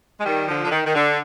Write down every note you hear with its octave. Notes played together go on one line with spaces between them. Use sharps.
G#3
D#3 G3
D3 F3
D3
D#3
D#3
D3